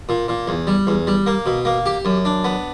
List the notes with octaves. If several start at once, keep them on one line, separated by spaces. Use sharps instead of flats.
A#2
A#2
E2
G3
E2
G3
A#3
B2
A#3
G4
F#2
D4
B3